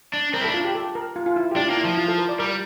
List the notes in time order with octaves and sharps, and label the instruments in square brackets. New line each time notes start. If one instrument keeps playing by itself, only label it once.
[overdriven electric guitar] D4
[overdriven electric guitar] C4 [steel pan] A#4
[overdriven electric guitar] E4
[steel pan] A4
[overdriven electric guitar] D4
[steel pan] F4
G4
A4
A#4
F4
F4
E4
G4
[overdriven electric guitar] D4 [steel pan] F4
[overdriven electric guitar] A#3
[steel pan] E4
[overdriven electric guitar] F3
[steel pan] F4
A4
A#4
D5
[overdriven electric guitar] G3 [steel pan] A#4